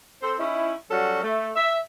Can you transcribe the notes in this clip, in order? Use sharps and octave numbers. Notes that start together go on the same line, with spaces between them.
C4 A4 C5
C#4 D#4 E4
F#3 G3 C#4 F#4 A4
A3
E5